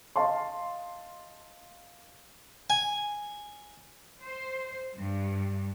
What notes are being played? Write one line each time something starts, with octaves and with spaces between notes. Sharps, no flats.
D#5 F5 A5 C6
G#5
C5
G2